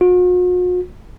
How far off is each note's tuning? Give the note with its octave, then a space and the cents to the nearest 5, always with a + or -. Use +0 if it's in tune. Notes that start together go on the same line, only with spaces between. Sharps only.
F#4 -45